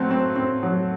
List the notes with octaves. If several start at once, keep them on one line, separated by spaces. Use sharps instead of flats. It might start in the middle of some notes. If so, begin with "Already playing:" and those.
Already playing: F#3 A3 C4
C4
C4
F#3